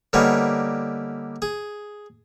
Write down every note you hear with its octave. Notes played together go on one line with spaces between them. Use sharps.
D3 G3 A#3 B3 C#4 D#4
G#4